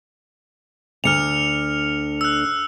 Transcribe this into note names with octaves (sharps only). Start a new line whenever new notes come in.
D2 D3 F6 C#7 F7
E6 F#6